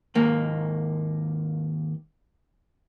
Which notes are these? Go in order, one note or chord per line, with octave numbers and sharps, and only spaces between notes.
D#2 G#2 A#3